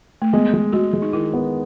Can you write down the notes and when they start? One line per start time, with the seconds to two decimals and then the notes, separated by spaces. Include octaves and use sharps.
0.22 A3
0.33 G#3 B3
0.54 G#3
0.73 G#3 F#4
0.93 G#3
1.02 D#4
1.13 D#3 E4
1.34 B3